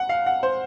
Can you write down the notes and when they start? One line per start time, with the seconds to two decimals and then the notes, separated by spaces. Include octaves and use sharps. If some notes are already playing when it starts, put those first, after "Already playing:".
Already playing: F#5
0.09 F5
0.26 F#5
0.43 C5